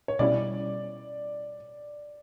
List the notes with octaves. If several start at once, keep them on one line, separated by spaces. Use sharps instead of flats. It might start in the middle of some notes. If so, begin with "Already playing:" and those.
C#5
B2 G3 C#4 E4 D5